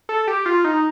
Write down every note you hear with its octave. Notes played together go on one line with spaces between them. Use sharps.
A4
G4
F4
D#4